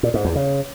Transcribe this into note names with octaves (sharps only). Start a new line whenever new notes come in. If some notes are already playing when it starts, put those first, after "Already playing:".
A#2
G#2
E2
C#3